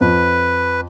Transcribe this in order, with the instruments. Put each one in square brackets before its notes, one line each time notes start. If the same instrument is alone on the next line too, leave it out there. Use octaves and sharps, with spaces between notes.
[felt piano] F2 [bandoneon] B4